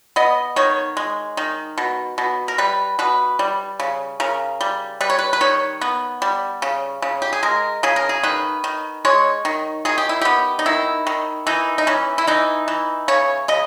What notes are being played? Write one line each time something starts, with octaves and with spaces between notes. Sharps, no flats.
B3 D#5
D#3 C#5
G#3
D#3
B2
B2
A#4
G3 B4
B2 B4
G3
C#3
C#3 A#4
G3
G3 B4
C#5
B4
B4
D#3 C#5
B3
G3
C#3
C#3
G4
G#4
G#3 A#4
C#3 G#4
A#4
G#4
D#3 B4
D#3
G#3 C#5
D#3
D#3 G#4
G4
E4
B3 G4
D#4
D#3 E4
D#3
E3 D#4
D#4
E3 C#4
E4
E3 D#4
E3
C#3 C#5
C#3 D#5